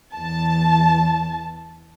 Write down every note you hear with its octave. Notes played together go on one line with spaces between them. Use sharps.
E2 A5